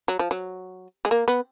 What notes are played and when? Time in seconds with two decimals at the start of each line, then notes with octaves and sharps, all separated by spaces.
0.08 F#3
0.19 F3
0.31 F#3
1.05 G#3
1.11 A#3
1.28 B3